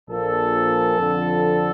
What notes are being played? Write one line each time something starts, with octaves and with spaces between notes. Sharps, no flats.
A#1 A#2 F3 A4
F2 D3 F3